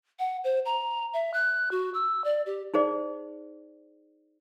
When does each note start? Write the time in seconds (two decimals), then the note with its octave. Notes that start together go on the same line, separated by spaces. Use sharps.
0.19 F#5
0.44 C5
0.65 A#5
1.14 E5
1.34 F#6
1.71 F#4
1.94 E6
2.24 D5
2.46 G4
2.74 D#4 G#4 C5 D5